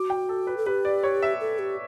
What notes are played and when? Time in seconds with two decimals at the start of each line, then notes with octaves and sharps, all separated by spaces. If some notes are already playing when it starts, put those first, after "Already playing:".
Already playing: F#4 D6
0.10 G5
0.29 A4
0.47 B4
0.57 A4
0.66 G4 B4
0.85 D5
1.03 C#5
1.22 E5
1.40 A4
1.59 G4